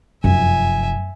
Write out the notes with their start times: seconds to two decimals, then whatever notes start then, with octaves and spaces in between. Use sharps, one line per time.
0.24 F1 F#2 E5 G#5